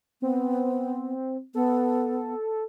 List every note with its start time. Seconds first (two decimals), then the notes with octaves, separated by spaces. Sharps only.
0.22 B3 C4
1.55 B3 A4